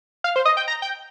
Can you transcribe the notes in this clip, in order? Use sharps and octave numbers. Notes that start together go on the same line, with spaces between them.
F5
C5
D#5
G5
A#5
G5